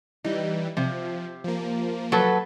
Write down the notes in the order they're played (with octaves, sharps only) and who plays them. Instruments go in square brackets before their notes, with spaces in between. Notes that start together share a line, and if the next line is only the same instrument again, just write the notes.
[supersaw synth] E3 G3 [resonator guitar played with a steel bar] D#4
[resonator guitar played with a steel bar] C3 [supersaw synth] F3
[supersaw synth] F3 A#3
[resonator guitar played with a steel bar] F#3 A4 B4